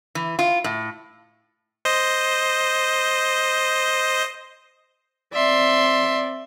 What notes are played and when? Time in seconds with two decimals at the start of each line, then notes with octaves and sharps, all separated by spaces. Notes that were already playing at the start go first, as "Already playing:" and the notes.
0.15 E3
0.39 F4
0.64 A2
1.85 C5 D#5
5.33 C4 D5 E5 C6